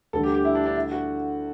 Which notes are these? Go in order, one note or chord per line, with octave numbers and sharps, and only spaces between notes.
D2 D3 G3 A4
G4
G4
E4
D4
D4
E4
F#4